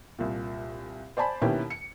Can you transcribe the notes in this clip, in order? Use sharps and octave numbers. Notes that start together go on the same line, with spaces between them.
C2 A#2
C5 D5 G#5 A5 B5
B2 D#3 A#3 C#4 E4 G4
C#7